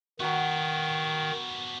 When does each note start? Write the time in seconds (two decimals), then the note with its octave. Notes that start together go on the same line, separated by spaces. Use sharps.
0.20 D#3 B3 D4 F#4 A#5